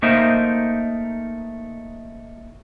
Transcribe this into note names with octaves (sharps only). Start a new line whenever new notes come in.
A3 A#3 D#4 A#4 C5 E5